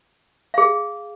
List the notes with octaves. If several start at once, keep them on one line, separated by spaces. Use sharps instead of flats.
G#4 F5